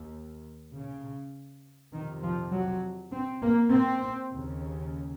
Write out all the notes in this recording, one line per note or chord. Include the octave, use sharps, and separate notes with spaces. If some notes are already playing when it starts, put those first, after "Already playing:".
Already playing: D#2
C#3
F2 C3 D#3
F3
F#3
C4
A#3
C4
D#2 C#3